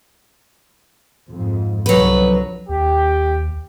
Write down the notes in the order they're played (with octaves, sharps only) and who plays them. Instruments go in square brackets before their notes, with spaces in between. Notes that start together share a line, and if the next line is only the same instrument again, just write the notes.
[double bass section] F2 G#2
[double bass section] C2 D3 F3 [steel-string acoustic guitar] F#3 B4
[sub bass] D#2 [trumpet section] G4